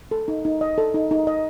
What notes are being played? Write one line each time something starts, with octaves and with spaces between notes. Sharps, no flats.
A4
D#4
D#4
D#5
A4
D#4
D#4
D#5